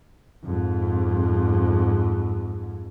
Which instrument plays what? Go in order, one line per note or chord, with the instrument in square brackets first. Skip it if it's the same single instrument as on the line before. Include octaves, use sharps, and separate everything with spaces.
[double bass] F2 G#2